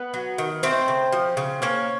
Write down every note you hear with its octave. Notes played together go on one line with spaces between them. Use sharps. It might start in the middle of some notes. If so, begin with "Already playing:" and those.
Already playing: B3 B4
F#3
D#3
A3 C4 C5
C#3
F3
C#3
A#3 C#4 C#5